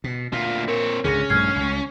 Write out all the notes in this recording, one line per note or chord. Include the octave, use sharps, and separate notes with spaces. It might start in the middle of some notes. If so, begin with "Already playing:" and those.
B2
D2 A#2 F4
C4 A#4 C#5
C#2 G#2 D3 C#4 G#4 A#6
A#1 G2 A3 F6 G#6 C7
C#2 C#3